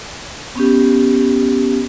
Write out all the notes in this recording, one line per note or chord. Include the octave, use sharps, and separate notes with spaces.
B3 C#4 G4